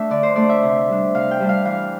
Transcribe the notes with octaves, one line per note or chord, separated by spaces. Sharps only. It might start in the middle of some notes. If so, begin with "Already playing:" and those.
Already playing: A3 D4 E5
D3 D5
C5
A3 D4 D5
E5
C3
G3 D4
C3 F5
G5
G3 D4
F5
E3 F5